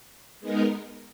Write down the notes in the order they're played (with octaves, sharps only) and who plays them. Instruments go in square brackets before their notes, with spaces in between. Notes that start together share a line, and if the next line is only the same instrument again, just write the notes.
[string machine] G#3 B3 D#4 A#4